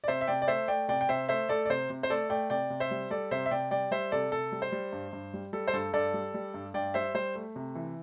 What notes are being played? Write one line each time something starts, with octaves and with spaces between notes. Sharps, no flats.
D5
C3 C5 E5
E5
C3 D5 G5
D5
A3 C5 E5
A3 D5 G5
C3 D5 G5
G5
C3 C5 E5
A3 C5 E5
A3 A4 D5
D5
C3 C5
C3
C5
A3 A4 D5
A3 D5 G5
C3 D5 G5
C3
C5 E5
G3
G3 A4 D5
C3 C5 E5
E5
C3 D5 G5
G3 D5 G5
G3 C5 E5
C3 A4 D5
C3 A4
G3
C5
G3
G2
G2
G3
G3 A4
C5
G2 A4
G2 A4 D5
G3
G3
G2
G2 D5 G5
G3 C5 E5
G3 C5
A3
C3
E3